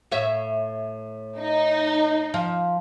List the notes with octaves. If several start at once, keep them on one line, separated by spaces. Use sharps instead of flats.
A2 C#5 E5
D#4
F3